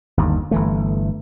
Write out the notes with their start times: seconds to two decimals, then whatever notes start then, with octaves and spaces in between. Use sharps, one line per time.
0.17 G1 D#2
0.51 G1 E3 A3